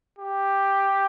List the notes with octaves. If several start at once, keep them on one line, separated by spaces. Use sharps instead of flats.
G4